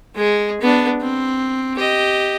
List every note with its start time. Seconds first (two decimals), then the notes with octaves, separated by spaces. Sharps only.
0.15 G#3 G#4
0.61 B3 D4
1.01 C4
1.76 G4 D#5